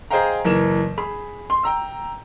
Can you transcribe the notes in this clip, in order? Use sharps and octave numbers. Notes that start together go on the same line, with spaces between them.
G#4 C5 D#5 F5 G5 A#5
F#1 E3 A#4 E7
G#4 B5
C6
G5 A#5 E6